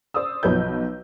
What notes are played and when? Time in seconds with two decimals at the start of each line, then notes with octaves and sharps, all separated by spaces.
0.14 C5 D5 D#6 E6
0.43 B1 F3 B4 C#5 G6